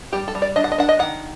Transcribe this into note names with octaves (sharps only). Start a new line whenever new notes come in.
G3 G4
A4
G3
D5
D4 D#5
F#5
D#5
D4 F#5
D#5
D#3 F#5